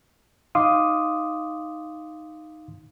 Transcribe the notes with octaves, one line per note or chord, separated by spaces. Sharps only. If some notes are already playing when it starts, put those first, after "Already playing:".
D#4 F5 C6 D6 D#6